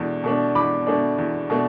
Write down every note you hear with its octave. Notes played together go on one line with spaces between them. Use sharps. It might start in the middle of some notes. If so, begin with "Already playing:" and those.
Already playing: E2 B2 A3 D4
B2 A3 D4
E2 B5 D6
B2 A3 D4
E2
B2 A3 D4